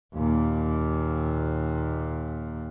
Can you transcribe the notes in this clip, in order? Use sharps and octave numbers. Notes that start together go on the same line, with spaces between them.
D#2 A#2